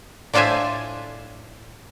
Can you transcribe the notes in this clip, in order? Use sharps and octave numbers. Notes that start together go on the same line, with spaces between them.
A2 D4 F4 C5 E5 G#5